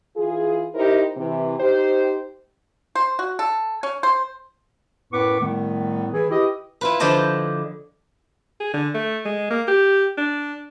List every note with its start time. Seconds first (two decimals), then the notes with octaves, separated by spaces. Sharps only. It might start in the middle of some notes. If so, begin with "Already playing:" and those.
0.17 E3 F4 G#4
0.75 D#4 E4 G4 A#4 C5
1.17 C3 E3
1.59 D#4 G4 C5
2.95 C5
3.19 F#4
3.39 A4
3.83 C#4
4.03 C5
5.13 F#2 A2 B3 B4 C#6 D6
5.40 A2 D#3 G3 A3 B3
6.14 E3 G#4
6.31 E4 G4 B4 D#5
6.81 E4 F4 B4
7.00 D3 F3 E4 D#5 G5 A5
8.60 G#4
8.74 D3
8.94 A3
9.25 G#3
9.50 A#3
9.68 G4
10.18 D4